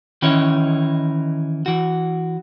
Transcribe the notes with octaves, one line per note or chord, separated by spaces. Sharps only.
D#3 E3 C#4 D#4 E4 C#5
E3 F#4